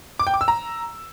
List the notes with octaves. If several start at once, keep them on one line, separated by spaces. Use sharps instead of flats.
D6
G5
D6
E6
A#5